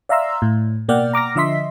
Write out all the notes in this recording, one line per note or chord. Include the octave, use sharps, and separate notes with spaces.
D5 E5 F5 A#5 C6 E6
A2
B2 A#3 D5 F#5 G5 F6
A#5 D6 F6 A#6
D3 F3 D#5 E5 C6 B6